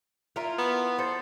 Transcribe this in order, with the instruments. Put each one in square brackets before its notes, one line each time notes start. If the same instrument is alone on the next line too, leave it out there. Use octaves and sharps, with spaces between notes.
[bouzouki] E4 F4 A#4
[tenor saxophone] B3
[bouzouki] A4 C5